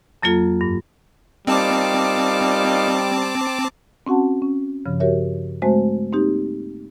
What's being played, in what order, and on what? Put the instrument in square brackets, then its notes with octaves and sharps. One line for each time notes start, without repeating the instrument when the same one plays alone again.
[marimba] F2 F#3 A#3 F4 A4
G2
[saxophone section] A#2 D#4 F5 [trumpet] G3 [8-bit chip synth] C4 A5 D6
[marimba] C4 C#4 F#4 F#5 A5
C#4
G2 C#3 F3
F#4 G4 A#4 C#5 E5
G#3 A3 C4 F#4 C5 E5
A#3 C4 D#4 G4